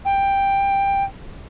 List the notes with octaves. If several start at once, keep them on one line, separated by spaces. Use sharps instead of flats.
G5